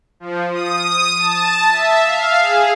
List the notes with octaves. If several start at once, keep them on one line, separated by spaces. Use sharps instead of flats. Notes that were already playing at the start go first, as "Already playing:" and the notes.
F3
D#6
D#6
A5
E5
F5
G#4